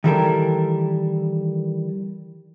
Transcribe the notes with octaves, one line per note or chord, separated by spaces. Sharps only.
D#3 E3 G3 F#4 A4 A#4